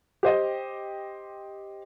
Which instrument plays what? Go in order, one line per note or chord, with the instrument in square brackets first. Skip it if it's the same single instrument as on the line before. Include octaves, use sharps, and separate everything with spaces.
[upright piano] G4 C5 D#5